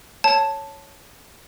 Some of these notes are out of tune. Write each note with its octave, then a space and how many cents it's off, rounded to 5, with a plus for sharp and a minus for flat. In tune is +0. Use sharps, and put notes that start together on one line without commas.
C#5 +0 A5 +0